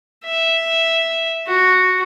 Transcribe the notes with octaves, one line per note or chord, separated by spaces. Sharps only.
E5
F#4